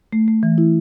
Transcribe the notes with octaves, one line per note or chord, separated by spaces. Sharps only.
A3
A3
E3
E4